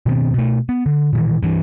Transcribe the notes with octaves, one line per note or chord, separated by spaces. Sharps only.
B2 D#3 B3 C4
B2 A3
B3
D3
A#2 D#3 E3
G2 E3